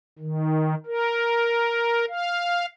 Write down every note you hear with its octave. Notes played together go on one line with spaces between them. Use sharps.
D#3
A#4
F5